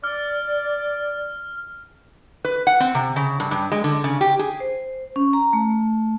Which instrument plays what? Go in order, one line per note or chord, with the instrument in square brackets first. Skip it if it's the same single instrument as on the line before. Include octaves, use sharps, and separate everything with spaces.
[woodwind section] D5 [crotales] F6
[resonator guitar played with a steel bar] B4
F#5
C4
C3
C#3
G2
G2
G#3
D3
C#3
G4
G#4
[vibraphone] C5
C#4
A#5
A3